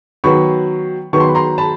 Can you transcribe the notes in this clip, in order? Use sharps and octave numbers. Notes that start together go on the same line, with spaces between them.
D#3 F#3 B3 B5 C#6
D#3 F#3 B3 C#6
C6
B5
A#5 C6
A5 B5